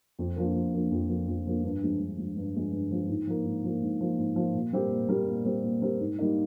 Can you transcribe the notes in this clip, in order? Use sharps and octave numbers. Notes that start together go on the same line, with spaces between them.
F2
D3 F3 A#3
F2
D3 F3 A#3
F2
D3 F3 A#3
F2
D3 F3 A#3
G2
D3 F3 G#3
G2
D3 F3 G#3
G2
D3 F3 G#3
G2
D3 F3 G#3
G#2
F3 A#3
G#2
F3 A#3
G#2
F3 A#3
G#2
F3 A#3
A#2
G3 C4 G4 A#4
A#2
G3 C4 G4 A#4
A#2
G3 C4 G4 A#4
A#2
G3 C4 G4 A#4
G#2
G3 A#3 D#4